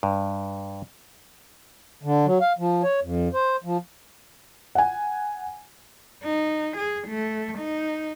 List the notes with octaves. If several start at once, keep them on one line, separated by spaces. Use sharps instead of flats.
G2
D3
F#3
F5
F3
C#5
F2
C5
F3
F#5 G#5
D#4
G#4
A3
D#4